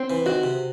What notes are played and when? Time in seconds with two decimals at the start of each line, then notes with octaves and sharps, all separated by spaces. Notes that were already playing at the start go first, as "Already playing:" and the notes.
Already playing: C4
0.10 E3
0.26 D#3 F#4
0.43 C3